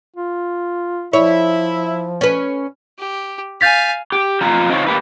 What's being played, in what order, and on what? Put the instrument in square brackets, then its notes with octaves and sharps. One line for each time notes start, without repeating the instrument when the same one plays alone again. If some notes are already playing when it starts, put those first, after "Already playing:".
[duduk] F4
[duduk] F3 [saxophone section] E4 [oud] C#5
[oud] C#4 B4
[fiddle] G4
[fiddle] F5 G#5 [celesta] G6 A6 B6
[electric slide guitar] G4
F2 F4 G#5 A#5
C4 D#4 F4 C#5
A#3 G4 B4